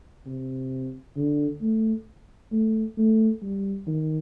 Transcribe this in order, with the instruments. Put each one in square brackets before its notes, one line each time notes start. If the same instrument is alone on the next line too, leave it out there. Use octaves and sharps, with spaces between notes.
[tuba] C3
D3
A3
A3
A3
G3
D#3